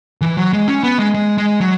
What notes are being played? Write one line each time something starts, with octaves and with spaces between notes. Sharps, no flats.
E3
F#3
G#3
C#4
B3
G#3
G#3
G#3
F#3